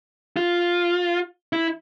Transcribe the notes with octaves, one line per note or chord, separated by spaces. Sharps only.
F4
E4